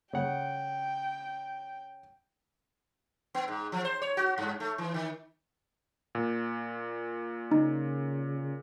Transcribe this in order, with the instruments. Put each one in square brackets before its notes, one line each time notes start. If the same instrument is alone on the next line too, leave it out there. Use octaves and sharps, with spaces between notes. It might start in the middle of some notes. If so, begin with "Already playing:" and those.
[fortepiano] C#3 F#5 [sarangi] G5
[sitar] B3
G#2
F3
C5
C#5
F#4
G2
A3
E3
D#3
[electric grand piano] A#2
[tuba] C#3 [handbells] D#4